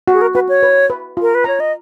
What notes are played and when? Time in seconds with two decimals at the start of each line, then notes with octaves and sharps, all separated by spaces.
0.08 F#4
0.14 G#4
0.22 A#4
0.35 F#4 B4
0.49 C#5
0.63 B4
0.90 B4
1.17 F4 A#4
1.35 B4
1.44 C#5 A#5
1.60 D#5